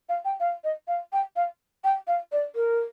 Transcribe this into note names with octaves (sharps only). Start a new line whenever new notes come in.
F5
G5
F5
D#5
F5
G5
F5
G5
F5
D5
A#4